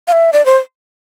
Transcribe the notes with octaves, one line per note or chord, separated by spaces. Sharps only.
F5
E5
D5
C5